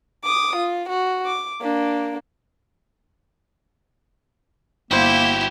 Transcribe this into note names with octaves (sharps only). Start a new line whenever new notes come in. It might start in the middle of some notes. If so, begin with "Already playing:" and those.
D6 D#6
F4
F#4
D6
A#3 D4
G1 A#3 E4 F#4 G4 C5